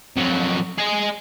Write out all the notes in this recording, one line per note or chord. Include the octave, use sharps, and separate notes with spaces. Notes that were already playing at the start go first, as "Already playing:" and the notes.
F2 F#3
G#4 D#5